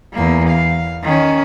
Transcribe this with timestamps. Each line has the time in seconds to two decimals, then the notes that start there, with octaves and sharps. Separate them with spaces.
0.13 E2 A#3
0.50 F5
1.03 D#3 C#4